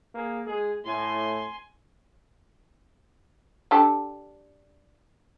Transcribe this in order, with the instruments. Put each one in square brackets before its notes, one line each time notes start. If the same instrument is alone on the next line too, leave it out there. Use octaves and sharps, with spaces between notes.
[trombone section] A#3 G#4
G#3 G#4
[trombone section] A2 [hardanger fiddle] G#5 C6
[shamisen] D4 G4 A4